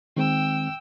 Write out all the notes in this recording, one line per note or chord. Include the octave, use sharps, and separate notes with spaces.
D#3 G#3 C4 G5 E6